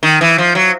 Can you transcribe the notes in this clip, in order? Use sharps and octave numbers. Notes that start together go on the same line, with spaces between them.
D#3
E3
F3
F#3